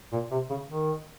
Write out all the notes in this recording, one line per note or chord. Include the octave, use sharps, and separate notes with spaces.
A#2
C3
C#3
D#3